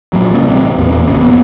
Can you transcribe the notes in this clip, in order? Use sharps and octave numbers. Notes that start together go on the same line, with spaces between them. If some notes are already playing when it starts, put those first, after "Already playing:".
A#2 F#3
C#3 G3
A1 C3
E1 E2 A#2
G#1 A#2 C#3
F2 A#3 B3